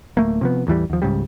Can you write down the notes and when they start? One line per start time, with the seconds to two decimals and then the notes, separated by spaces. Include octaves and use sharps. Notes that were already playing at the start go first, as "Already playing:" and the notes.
0.17 D1 A3 A#3
0.41 C3 F3 B3
0.67 A1 E2 E3 G3
0.90 D#2 F3
1.02 C#2 G#2 C#3 G3